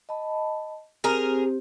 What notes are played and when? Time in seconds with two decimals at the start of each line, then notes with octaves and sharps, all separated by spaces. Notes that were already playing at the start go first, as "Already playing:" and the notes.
0.09 D#5 A5 B5
1.04 C4 G4 G#4 A#4 C5